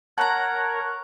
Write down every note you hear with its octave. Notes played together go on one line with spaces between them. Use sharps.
A#4 C#5 F#5 A5 A#5 F#6